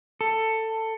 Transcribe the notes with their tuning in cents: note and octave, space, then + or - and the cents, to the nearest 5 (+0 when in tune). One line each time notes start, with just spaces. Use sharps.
A4 +15